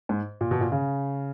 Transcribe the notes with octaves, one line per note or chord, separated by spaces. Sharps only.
G#2
A#2
B2
A#2
C#3